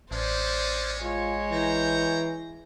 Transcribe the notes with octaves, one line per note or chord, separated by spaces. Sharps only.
A1 G3 G#3 C#4 C5 D5
G#3 F4 C#5
E3 C5 G5 A#5